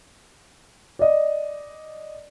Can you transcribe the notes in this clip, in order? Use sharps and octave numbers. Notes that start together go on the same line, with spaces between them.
D5 D#5